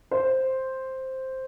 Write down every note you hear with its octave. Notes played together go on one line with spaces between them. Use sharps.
C5